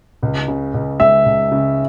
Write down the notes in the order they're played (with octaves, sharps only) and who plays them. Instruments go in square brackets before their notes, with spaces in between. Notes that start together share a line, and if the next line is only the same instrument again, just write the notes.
[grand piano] C#2
C#3
C#2
[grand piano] G#3 [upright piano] E5
[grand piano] C#2
C#3